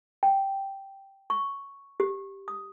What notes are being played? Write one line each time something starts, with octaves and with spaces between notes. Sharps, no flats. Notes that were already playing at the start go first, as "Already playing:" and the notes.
G5
C#6
G4
D#6